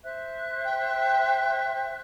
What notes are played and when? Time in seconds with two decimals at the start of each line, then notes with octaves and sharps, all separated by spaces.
0.04 C5 E5 F#6
0.65 G5